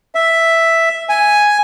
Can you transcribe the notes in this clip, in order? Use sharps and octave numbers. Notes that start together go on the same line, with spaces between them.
E5
G#5